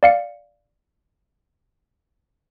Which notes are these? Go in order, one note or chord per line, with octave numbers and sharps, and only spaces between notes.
D5 F5 C#7